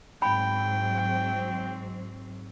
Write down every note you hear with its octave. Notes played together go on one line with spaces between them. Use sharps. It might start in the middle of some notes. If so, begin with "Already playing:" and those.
G#2 F#3 C4 G5 B5